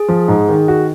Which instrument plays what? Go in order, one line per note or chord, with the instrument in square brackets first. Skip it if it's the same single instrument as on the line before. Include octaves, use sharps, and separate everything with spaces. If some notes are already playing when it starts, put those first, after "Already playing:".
Already playing: [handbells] G#4
[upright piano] F3
G#2
D#3
F#4